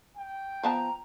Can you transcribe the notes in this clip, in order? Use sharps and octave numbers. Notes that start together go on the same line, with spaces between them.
G5
F3 B3 A5 A#5